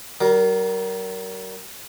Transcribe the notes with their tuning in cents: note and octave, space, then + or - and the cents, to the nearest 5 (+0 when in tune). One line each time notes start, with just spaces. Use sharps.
G3 -45 A#4 +0